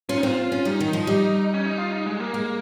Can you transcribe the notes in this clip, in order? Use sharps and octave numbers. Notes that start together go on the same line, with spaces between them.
C#4 F4
D#4
C4 F4
C#4
G3 D#4
D#3
F3
G3
C#4
D#4
F4
D#4
G#3
A#3
G#3